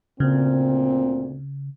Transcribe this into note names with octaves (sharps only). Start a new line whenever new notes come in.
D2 A#2 C#3 C4